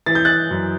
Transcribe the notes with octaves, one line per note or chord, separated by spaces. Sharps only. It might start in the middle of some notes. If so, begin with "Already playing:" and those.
E3 A6
G6
F#6 A6
F#2